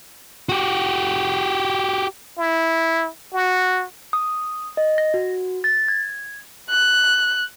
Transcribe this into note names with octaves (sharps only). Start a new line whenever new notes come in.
F#4 G4
E4
F#4
D#6
D#5
A#6
F#4
A6
G#6
F#6